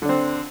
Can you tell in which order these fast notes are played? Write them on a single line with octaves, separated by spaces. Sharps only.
D3 D4 C4